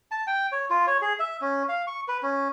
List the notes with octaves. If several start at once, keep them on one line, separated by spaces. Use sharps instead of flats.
A5
G5
C#5
F4
C#5
G#4
E5
C#4
F5
C#6
B4
C#4